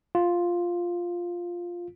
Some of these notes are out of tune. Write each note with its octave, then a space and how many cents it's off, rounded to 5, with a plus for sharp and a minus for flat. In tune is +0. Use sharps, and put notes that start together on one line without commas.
F4 +5